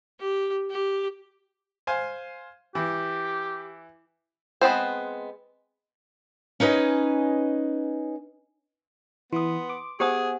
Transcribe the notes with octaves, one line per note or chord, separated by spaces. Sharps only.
G4
G4
C5 F5 G#5
E3 G4
G#3 B3 C4 C5
C#4 D#4 B4 D#5 G#5
E3 B3 C6 D#6
D6
B3 G4 G#4 C5 F#5 G#5 D#6